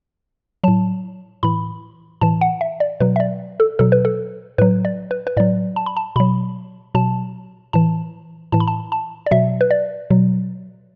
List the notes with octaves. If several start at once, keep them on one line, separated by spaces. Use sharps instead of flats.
A2 F#3 A5
A2 E3 B5
A2 E3 A5
F#5
E5
D5
B2 F#3 B4
E5
D5
A4
B2 F#3 A4
B4
A4
A2 F#3 B4
D5
B4
B4
A2 F#3 D5
A5
B5
A5
B2 F#3 B5
B2 F#3 A5
A2 E3 A5
A2 E3 A5
B5
A5
A5
D5
B2 F#3 E5
B4
D5
B2 F#3